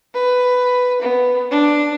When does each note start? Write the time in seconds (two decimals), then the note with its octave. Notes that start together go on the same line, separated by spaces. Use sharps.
0.14 B4
1.01 B3
1.51 D4